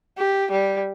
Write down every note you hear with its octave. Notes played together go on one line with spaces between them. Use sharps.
G4
G3